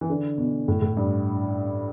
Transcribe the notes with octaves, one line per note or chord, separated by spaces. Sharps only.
E3
D3
B2
A2
A2
G2